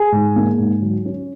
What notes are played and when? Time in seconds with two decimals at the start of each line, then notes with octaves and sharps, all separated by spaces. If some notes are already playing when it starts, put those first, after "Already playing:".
Already playing: G#4 G#5
0.12 G#2
0.36 A#3
0.59 G#2
0.82 F#3
1.06 C#4